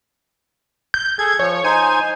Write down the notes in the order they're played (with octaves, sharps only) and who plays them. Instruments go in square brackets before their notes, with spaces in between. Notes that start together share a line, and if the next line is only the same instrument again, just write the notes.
[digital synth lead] G6
[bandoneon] G#4 A4 [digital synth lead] G#6
[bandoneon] F3 [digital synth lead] C#5
[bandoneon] D#4 C5 [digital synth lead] G#5